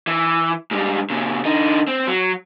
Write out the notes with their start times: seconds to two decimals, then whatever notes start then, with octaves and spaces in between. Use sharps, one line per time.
0.07 E3
0.71 G#2 G3
1.10 A#2 C#3
1.45 D3 D#4
1.88 C4
2.07 F#3